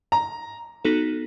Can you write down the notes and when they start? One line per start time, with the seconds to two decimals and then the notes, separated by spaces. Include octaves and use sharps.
0.12 A#5
0.85 B3 D#4 F#4 A4